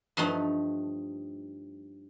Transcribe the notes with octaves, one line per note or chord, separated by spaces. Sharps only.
G2 F3 A3 D#4